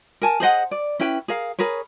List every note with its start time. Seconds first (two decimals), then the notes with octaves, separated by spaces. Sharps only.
0.22 A#4 G#5 A5
0.40 G#4 C5 D#5 F#5
0.71 D5
0.99 C#4 E4 B4 G5
1.28 G#4 A#4 F5
1.59 G#4 A#4 B4 C#5